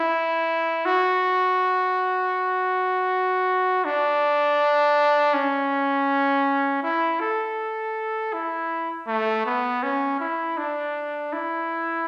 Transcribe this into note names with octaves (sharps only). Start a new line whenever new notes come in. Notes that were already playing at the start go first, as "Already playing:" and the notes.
Already playing: E4
F#4
D4
C#4
E4
A4
E4
A3
B3
C#4
E4
D4
E4